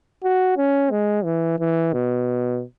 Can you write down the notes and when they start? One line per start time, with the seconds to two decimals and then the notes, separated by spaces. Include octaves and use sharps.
0.23 F#4
0.57 C#4
0.90 G#3
1.24 E3
1.59 E3
1.93 B2